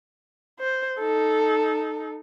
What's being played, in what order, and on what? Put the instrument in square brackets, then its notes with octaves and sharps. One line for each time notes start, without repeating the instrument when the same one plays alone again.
[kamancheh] C5
D#4 A4